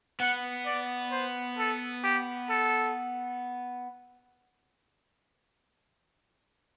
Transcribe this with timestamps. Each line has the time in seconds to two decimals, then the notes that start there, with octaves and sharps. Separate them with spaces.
0.20 B3 F#5
0.66 D5
1.12 C5
1.58 A4
2.04 G4
2.50 A4